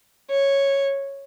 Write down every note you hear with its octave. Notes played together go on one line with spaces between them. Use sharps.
C#5